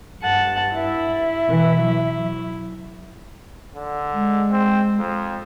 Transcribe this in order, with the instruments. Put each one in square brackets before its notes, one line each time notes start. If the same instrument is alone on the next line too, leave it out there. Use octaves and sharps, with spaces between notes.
[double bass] G2 [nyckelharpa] F#5 A5
[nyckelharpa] E4 [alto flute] E5
[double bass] B2 E3
F#3
[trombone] D3
[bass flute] G#3
[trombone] C4
F2